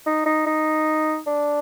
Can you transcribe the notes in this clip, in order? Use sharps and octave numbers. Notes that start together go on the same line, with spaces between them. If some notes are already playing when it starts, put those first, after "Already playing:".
D#4
D#4
D#4
D4